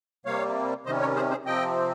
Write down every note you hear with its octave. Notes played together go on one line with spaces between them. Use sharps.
C3 G3 A#3 C#5 F5
C3 D#3 G3 C#4 C5 D#5
A#4 C#5
G#4 C5
G#4 C5
C3 F3 C4 D#5 G5